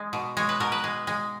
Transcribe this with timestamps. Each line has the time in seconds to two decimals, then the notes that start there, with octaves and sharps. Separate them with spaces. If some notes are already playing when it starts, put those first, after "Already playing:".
Already playing: G#3
0.13 B2
0.37 G#3 C#5
0.49 B4
0.60 B2 A#4
0.72 B4
0.84 G#3
1.07 G#3